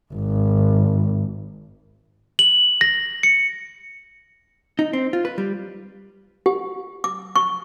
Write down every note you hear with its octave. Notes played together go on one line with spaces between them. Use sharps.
G#1
F#7
A#6
C#7
D#4
C4
F4
B4
G3
G4
D6
C#6